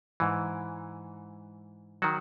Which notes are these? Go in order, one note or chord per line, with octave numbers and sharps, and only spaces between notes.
G#2 E3
D#3 F#3 F#4